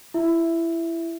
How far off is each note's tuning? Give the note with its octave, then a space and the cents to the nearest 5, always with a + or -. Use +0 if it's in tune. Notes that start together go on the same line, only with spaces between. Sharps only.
E4 +20 E5 +0